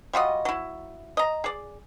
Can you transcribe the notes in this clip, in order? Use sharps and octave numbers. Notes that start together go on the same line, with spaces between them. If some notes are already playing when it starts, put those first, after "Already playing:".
G3 F4 F#4 D#5
F#3 E4
D#5 A#5
G#4 D5